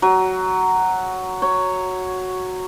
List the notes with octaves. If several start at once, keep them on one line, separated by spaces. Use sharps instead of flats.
F#3
C#5